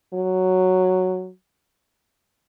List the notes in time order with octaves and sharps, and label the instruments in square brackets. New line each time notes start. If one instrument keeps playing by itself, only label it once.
[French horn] F#3